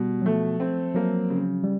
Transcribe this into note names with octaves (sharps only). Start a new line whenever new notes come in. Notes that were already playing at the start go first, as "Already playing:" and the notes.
Already playing: B2 G3
F#3
F3 A3
C4
F#3 A#3
C#3
G3